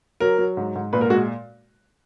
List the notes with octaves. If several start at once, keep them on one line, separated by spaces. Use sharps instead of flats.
F#3 A#4
F#3
G#2
G#2
A#2 B4
A#4
G#3 F#4